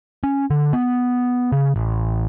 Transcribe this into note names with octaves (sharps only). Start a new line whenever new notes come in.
C#4
D3
B3
C#3
A1